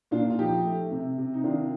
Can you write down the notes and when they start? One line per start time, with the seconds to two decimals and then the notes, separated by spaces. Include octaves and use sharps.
0.11 A#2 D4 F4
0.30 F4
0.39 F3 D#4 G4
0.65 A3
0.91 C3
1.18 C3
1.34 D#4
1.44 D#3 D4 F4